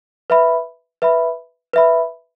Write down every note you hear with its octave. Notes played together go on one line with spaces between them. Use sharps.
B4 E5 B5
B4 E5 B5
B4 E5 B5